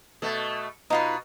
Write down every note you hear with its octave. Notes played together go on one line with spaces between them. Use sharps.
B2 A3
B2 D#4 F4 B4